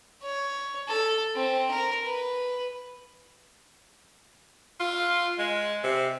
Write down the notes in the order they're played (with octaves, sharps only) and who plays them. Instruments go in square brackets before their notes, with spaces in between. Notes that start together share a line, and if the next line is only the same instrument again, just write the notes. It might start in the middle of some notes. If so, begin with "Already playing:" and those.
[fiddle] C#5
A4
C4
A#4
B4
[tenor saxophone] F4
G#3
C3